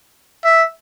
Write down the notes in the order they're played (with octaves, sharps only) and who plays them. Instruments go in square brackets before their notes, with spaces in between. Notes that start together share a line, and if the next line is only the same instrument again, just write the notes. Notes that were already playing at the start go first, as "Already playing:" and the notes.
[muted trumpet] E5